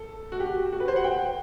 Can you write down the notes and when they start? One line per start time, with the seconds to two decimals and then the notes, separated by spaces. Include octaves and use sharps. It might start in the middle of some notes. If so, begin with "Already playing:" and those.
Already playing: A4
0.32 F#4
0.40 G4
0.72 F#4
0.80 B4
0.88 C5
0.96 F#5
1.04 G5